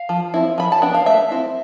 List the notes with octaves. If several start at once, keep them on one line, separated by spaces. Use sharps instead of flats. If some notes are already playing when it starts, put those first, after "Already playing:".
Already playing: F5
F3
C4 E4
F3 B5
A5
B3 D4 G5
F5
A3 E5
C4 E4